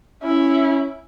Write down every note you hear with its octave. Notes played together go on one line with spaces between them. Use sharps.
C#4 E4